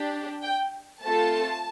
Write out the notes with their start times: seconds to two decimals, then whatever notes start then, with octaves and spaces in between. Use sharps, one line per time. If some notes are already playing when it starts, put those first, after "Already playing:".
Already playing: D4 G4
0.43 G5
1.01 A3 C4 F4 A4 A5